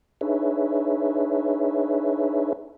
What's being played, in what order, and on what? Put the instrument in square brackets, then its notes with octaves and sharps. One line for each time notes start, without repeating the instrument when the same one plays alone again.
[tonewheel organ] D4 D#4 G#4 B4 C#5 E5